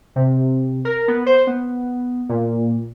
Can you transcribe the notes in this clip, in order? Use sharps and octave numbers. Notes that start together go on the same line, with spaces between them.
C3
A#4
B3
C5
B3
A#2